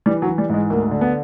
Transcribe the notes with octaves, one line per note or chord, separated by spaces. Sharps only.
E3 G3
F#3
E3
G3
G#2 G#3
D2 A#3
D3
B3